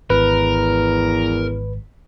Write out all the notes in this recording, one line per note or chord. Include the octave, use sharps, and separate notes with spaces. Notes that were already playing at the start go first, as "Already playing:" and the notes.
G#1 E2 A#4 B4